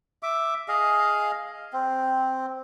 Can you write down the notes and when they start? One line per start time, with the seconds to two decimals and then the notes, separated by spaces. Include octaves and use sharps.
0.23 E5 D6
0.68 G#4 D#5 F5
1.73 C4